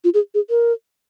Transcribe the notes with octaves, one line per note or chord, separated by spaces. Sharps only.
F4
G#4
G#4
A#4